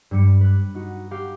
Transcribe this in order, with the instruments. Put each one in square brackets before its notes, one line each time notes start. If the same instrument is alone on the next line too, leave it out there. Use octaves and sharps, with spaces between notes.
[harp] G2 G3 C#7
B4 F#6
D#4 F#4
F#4 G4 F5